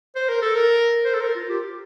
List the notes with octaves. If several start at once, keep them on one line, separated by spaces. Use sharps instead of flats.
C5
A#4
A4
A#4
C5
A4
A#4
F4
G4